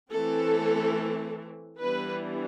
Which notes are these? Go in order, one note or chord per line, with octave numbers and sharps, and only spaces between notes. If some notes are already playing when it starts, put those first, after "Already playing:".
E3 A3 C4 A4
E3 G3 B3 D4 B4